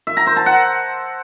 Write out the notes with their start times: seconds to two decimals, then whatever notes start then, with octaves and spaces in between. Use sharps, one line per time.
0.07 E5
0.17 A#5
0.27 C5
0.36 A5
0.46 F#5